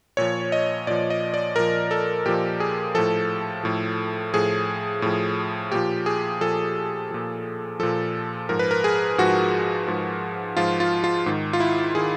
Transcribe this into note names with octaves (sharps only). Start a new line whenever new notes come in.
A#2 F3 C#5
D#5
A#2 F3 D5
D#5
D5
A#2 F3 A#4
A4
A#2 F3 G4
G#4
A2 F3 A4
A2 F3
A2 F3 G#4
A2 F3
A#2 F3 G4
G#4
A#2 F3 A4
A#2 F3
A#2 F3 A4
G#2 F3 A#4
B4
A#4
G#4
G#2 F3 F#4
G#2 F3
G#2 F3 F4
F4
F4
G#2 D#3
F4
E4
D#3 G#4